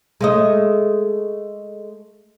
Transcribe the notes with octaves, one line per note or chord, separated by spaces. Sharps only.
G#3 A3 D#5